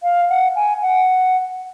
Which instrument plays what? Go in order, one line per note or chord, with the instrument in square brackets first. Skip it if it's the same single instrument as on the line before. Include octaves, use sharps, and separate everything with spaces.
[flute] F5
F#5
G#5
F#5